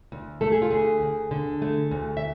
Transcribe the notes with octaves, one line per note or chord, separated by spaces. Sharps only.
D2
A3 A4
G#4
F4
D2 G#4
D2
D3
A3
D2
E5